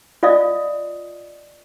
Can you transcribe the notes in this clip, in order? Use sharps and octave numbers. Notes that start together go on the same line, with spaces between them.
F4 D5 D#5 F5 D#6